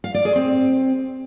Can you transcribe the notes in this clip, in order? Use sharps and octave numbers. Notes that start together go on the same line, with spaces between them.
F5
D5
G#4
C4